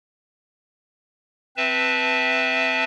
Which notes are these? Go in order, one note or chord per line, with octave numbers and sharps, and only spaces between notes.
C4 B4 E5 A5